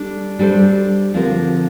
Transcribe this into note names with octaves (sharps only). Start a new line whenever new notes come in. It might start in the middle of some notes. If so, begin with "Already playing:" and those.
Already playing: G3 D4 A4
G3 D4 A4 C5
D3 F3 C4 G4 A#4